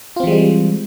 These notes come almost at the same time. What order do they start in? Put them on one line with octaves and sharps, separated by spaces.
F4 C4 E3 G#3 G3